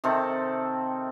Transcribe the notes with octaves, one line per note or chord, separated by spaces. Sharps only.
C3 D#3 C4 A4